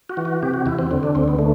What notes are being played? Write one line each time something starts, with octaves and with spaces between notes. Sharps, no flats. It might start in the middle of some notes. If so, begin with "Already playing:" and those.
F#4
E3
F#4
C3 G4
F#4
E2 E4
C4
D3 C4
D4
D2 C4
B3
D3 A3